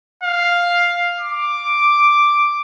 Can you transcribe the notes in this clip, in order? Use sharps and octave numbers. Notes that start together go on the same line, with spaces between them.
F5
D6